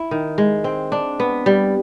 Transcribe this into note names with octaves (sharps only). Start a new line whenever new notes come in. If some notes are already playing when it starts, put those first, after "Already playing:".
Already playing: E4
D#3
G#3
C4
D4
B3
G3